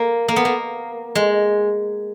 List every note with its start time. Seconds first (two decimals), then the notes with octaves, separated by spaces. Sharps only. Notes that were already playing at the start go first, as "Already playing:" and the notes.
Already playing: A#3
0.28 A#3
0.36 B3
0.45 A#3
1.15 G#3